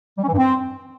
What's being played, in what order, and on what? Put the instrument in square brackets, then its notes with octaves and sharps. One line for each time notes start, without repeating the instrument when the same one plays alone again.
[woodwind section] G3
C#4
E3
G2
C4